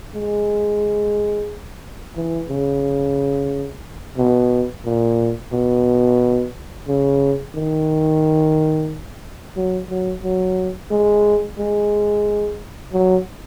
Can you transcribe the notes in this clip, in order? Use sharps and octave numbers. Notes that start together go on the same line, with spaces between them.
G#3
E3
C#3
B2
A#2
B2
C#3
D#3
F#3
F#3
F#3
G#3
G#3
F#3